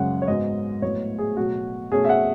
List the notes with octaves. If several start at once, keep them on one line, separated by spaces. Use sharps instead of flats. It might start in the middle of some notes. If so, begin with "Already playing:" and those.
Already playing: F#2 C#3 G#3 C#4 F#5
C#5
G#2 F#3 B3 D#5
A2 F#3 B3 C#5
G#4
B2 F#3 A3 F#4
B2 A3 C#4 G#4
E5
F#5